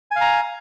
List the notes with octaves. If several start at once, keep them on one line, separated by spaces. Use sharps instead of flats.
F5 G#5 A#5